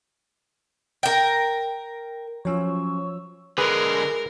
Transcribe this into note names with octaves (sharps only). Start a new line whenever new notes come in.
A#4 G5
F3 F#3 C#4 F4 C#5 C#6 E6
D3 G#3 G#4 A#4 B4